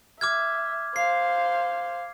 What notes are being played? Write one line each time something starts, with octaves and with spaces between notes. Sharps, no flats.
E5 D6 F6 G#6
C5 F5 C7